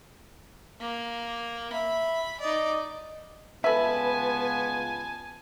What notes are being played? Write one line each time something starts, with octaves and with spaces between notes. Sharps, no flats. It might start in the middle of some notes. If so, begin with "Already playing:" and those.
A#3
E5 B5
D#4 D5 D#5
C#2 B3 F4 A4 B4 E5 G#5 A5